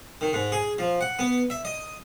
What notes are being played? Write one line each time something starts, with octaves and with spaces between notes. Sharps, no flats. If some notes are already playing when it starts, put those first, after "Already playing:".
D#3
G#2
G#4
F3
F#5
B3
E5
D#5